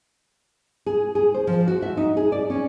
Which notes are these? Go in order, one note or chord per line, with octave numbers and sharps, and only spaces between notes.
G#4
G#4
C5
F3
F#4
E5
D#4
G#4
D5
C#4